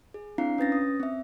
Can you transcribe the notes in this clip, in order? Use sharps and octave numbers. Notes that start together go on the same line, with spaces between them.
G#4
C4 D4 E4 F5 A#5 C7
C#4 B4 A6 A#6
D#6
C4 E5